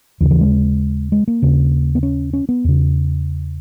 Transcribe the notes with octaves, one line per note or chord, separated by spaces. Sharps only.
D#2 C#3 E3
E3
G#3
G#3
A#3
D#2 C#3
B3
C#4
C#4
B3
E2 C#3